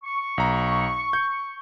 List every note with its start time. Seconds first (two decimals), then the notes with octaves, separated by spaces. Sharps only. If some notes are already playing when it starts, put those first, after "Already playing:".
0.04 C#6
0.38 B1 A#5
1.13 G6